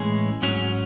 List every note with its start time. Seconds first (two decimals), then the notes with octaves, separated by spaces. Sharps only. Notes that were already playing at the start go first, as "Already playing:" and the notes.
Already playing: A2 E3 G#3 C#4 G#4
0.42 G#2 F#3 C#4